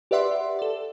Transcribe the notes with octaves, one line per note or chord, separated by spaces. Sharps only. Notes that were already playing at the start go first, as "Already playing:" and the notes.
G4 B4 D5 E5 F#5 C6
A4 D5